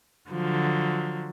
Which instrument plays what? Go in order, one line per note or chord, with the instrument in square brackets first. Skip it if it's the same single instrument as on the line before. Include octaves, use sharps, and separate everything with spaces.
[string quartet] D3 F3 F#3